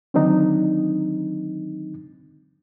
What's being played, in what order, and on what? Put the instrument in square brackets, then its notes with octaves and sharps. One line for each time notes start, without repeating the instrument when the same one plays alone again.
[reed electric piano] D3 D#3 F#3 C4 D4 D#4